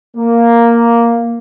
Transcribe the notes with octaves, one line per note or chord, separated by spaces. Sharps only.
A#3